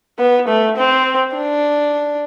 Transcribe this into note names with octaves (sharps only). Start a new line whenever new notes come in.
B3
A3
C4
D4